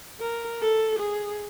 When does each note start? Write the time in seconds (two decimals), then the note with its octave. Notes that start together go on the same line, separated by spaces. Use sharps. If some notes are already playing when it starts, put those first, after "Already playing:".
0.20 A#4
0.61 A4
0.99 G#4